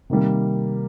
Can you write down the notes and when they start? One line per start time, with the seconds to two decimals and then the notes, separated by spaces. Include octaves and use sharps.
0.10 C3 D#3 G3 A#3